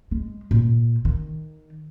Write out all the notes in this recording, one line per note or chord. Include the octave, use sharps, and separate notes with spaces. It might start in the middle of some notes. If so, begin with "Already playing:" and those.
G#3
A#2
D#3